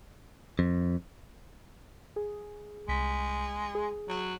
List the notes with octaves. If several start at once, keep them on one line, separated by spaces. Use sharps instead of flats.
F2
G#4
C2 G#3 B6
G#4
F#3